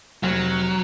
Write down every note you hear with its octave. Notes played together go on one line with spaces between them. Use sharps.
F1 F#3